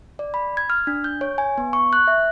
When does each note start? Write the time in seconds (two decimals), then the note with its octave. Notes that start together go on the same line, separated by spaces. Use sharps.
0.19 D5
0.34 B5
0.57 G#6
0.70 F6
0.87 D4
1.04 G6
1.21 C#5
1.38 G#5
1.58 B3
1.73 C#6
1.93 F#6
2.08 E5